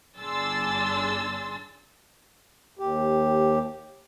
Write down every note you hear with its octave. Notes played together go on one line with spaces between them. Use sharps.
G1 D4 G#4 C6 E6 A6
D#2 G4